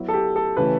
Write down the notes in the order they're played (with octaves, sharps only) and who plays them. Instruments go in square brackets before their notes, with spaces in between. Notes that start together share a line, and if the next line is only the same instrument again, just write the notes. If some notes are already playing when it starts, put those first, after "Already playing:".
Already playing: [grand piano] F#3 B3 E4
[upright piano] A4
G4
A4
[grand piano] C#3 E3 A3 C#4 [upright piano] B4